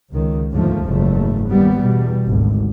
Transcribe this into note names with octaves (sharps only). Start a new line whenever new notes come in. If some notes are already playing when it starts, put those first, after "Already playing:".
C#2 D#3
D#2 G#2 D3 F3 A3
F#1 E2 G#2 A3
D#2 G3 B3
E2 B2 G3
G#1 D2